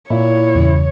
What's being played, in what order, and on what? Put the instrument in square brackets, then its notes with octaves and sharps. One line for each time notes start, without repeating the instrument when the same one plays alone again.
[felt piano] A#2 [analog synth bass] E4 [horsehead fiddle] C#5
[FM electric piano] E2 G2 C#3